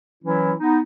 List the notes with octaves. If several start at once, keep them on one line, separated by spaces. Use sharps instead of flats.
E3 F#3 C#4 E4
B3 D#4